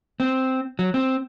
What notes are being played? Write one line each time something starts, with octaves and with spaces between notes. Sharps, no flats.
C4
F#3
C4